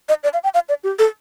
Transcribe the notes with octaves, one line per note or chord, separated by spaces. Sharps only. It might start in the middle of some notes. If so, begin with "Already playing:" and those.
D#5
D5
F5
G5
F5
D5
G4
A4